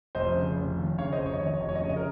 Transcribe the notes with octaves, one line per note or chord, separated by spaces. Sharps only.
F1 C5 D#5
C#3
F1
D#2
C#3 C#5 F5
C5 D#5
F1
C#5
D#5
D#2 C#5
D#5
C#5
F1 D#5
C#5
D#5
C#3 C#5
D#5
A#4